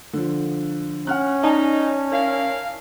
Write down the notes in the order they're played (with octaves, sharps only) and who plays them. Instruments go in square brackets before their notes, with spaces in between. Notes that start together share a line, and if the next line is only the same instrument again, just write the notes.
[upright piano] D3 F3
[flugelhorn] C#4 [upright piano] F#5 F6 F#6
[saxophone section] D#4 [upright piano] D5 G#5 A5
[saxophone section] E4 A#4 F5